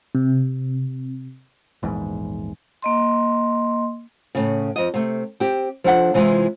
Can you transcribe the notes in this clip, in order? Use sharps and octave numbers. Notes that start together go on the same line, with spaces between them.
C3
A#1 E2 G#2
A#3 D#5 C6
A2 C#3
F2 D#5
C3 A3
C4 G4
F3 D4 A4 E5 F#5
C3 E3 G#3 F4